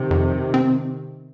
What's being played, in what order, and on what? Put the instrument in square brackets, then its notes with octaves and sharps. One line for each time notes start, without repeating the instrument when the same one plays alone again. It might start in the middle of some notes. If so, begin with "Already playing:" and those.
Already playing: [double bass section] C3 D#3
[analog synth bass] F2
C4